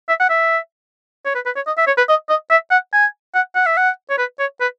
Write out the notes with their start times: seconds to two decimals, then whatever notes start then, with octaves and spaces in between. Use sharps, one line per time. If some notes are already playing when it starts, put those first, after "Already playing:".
0.09 E5
0.20 F#5
0.30 E5
1.25 C#5
1.35 B4
1.45 B4
1.56 C#5
1.67 D#5
1.77 E5
1.87 C#5
1.97 B4
2.08 D#5
2.29 D#5
2.50 E5
2.71 F#5
2.93 G#5
3.35 F#5
3.55 F#5
3.66 E5
3.77 F#5
4.10 C#5
4.18 B4
4.39 C#5
4.60 B4